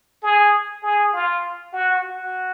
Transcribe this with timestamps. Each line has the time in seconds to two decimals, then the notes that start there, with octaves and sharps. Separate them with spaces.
0.23 G#4
0.83 G#4
1.13 F4
1.73 F#4
2.03 F#4